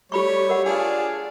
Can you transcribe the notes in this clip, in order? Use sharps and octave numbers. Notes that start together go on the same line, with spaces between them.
G3 A3 G4 C#5 B5 C#6
A#4 F#5
D4 F4 G#4